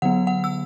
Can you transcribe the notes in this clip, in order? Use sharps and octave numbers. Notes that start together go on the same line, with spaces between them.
D3 F#3 B3 F#5
F#5
E6